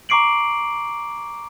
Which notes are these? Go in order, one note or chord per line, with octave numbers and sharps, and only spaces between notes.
A#5 C#6 D6 C7 D7 F#7